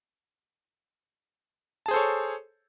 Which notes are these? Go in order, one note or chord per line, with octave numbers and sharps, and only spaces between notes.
G#4 A4 C5 C#5 A5